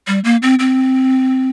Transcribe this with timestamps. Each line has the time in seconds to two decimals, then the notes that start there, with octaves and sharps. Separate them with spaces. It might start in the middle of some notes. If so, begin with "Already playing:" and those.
0.07 G3
0.24 A#3
0.43 C4
0.59 C4